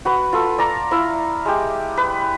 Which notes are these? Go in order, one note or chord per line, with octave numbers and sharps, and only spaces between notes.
F#4 B4 F#5
F4 A4
D5 A5 A#5 C#6
E4 E5 F5
G#3 G4
B4